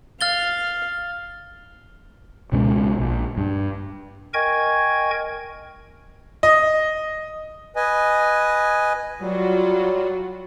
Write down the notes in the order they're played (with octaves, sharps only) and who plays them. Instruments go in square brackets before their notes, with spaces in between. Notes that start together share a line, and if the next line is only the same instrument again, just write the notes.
[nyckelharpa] F5 [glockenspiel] F6 A6 G7
[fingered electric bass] C#2 B2 G#3 C#4
A#1
G2
[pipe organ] A#4 D#5 G5 G#5 C#6 G#6
[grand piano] D#5
[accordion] B4 D#5 G#5
[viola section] F#3 F4 F#4 [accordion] G3